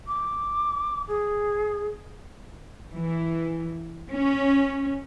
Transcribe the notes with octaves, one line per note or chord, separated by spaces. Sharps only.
D6
G#4
E3
C#4